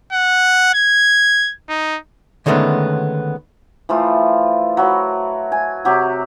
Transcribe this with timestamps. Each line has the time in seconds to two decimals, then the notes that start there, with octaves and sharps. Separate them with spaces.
0.13 F#5
0.74 G#6
1.69 D#4
2.46 D3 D#3 G#3 A3 B3 C#4
3.89 E3 F3 A3 F4
4.77 F#3 B5
5.52 G#5
5.85 C3 F#3 G4